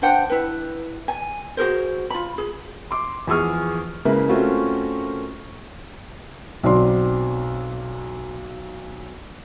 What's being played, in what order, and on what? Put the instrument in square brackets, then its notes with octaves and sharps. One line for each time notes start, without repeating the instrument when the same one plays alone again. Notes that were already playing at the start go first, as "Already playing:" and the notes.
[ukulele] D4 C5 F#5 G5
E4 B4
G#5
F#4 G#4 A#4 C5
F4 B5
G#4
[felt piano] C6 D6
E2 F3 G#4 C#6 D#6 F6
C#3 G#3 A#3 E4 A#4 B4
A3 C4 C#4 F4 F#4 A#4
B1 F#3 C4 D5 C6